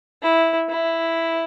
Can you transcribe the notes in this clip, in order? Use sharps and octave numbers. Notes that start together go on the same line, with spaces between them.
E4
E4